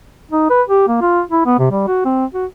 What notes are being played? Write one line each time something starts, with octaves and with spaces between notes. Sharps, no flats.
D#4
B4
G4
A#3
F4
E4
B3
C3
G3
F#4
C4
F#4